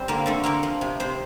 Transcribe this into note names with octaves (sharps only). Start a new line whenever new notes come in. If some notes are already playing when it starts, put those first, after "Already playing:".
Already playing: G3 C4 C5
D3 A#3 A#4
D3 A3 A4
A#3 C4 A#4
F3
C3
C3 C5